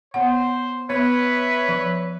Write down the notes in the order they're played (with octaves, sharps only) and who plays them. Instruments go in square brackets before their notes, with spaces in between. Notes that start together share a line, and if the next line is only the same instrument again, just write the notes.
[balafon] B3 C#5 F#5 [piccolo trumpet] C5
[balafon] B3 [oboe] B4 [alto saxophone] C#5 [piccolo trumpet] E5
[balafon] F3